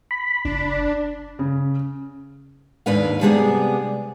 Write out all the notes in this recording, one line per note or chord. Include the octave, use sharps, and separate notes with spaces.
B5
F#1 D4
C#3
D#2 G#2 D4 B4 F5
C3 G3 G#3 B3 D4 G#4